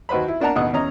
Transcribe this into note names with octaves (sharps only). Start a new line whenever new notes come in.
D#2 F#4 B4 C5 B5
E4
A#3 D4 D5 F#5 A5 A#5
A1 D#2 B2 F#5 D#6
E2 C#4 D#5 A#5